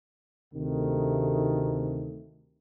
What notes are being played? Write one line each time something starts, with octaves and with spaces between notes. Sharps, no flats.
D2 C3 D#3 A3